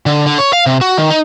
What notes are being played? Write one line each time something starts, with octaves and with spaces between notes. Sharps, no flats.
D3
D3
C#5
F5
C3
F#4
D#3
D#4